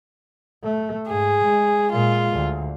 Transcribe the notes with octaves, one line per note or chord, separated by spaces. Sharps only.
A3
G#2 G#4
G#3
A#2 G#3 F4
D2